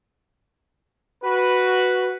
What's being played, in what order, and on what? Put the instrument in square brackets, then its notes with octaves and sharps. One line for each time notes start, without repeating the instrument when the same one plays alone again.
[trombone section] F#4 B4